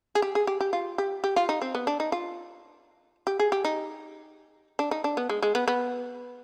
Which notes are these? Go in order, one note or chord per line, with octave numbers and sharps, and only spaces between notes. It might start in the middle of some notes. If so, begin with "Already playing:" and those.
G#4
G4
G#4
G4
G4
F4
G4
G4
F4
D#4
C4
B3
D4
D#4
F4
G4
G#4
G4
D#4
D4
D#4
D4
B3
G#3
G#3
B3
B3